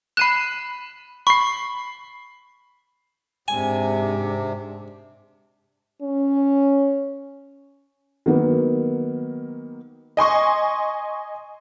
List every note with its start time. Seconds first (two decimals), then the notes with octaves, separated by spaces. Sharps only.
0.17 B5 F#6 C7 D#7 E7
1.27 B5 C#6 C7
3.48 G#2 C3 D4 G#5
6.02 C#4
8.26 D#3 F#3 A#3 B3
10.17 D#5 G#5 C6 C#6